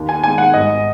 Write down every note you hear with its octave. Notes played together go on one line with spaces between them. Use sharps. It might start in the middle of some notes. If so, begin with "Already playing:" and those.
Already playing: D#2
G#5
D#3 G#3 G#5
F#5
G#1 D#5